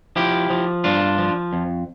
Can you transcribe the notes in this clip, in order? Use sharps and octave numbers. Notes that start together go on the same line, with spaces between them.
F3 E4 G4
F3
G2 D4 F4
F3
F2